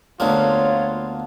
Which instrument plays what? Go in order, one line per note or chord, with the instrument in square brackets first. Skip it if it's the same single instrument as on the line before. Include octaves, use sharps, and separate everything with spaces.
[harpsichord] D2 A#3 [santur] B3 D4 F5 [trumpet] F4 [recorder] C#5